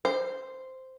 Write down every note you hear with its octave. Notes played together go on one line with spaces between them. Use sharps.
C5